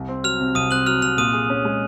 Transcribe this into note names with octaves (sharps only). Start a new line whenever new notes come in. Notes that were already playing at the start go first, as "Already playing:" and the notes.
Already playing: C2
C4
F#3 F6 F7
C3
C2 D#6 D#7
C4 F#6 F#7
F#3 F6 F7
C3 F6 F7
A#2 D#6 D#7
G#4
C#4
G#3